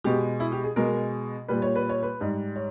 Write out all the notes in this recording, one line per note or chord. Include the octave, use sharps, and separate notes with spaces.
B2 G#3 G4
E4
G4
G#4
B2 G#3 A#4
A#2 G3 B4
C#5
B4
C#5
B4
G#2 G3
C#5